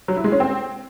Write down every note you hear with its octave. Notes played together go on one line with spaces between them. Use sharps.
F#3
E4
G#3
C#4
C4